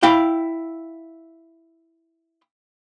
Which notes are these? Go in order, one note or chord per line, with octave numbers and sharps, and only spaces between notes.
E4 F5 G5